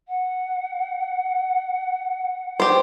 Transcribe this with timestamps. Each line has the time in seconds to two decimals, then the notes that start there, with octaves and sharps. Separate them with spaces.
0.08 F#5
2.60 G4 C5